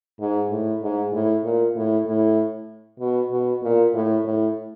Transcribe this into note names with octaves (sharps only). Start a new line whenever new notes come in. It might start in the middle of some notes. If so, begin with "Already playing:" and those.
G#2
A2
G#2
A2
A#2
A2
A2
B2
B2
A#2
A2
A2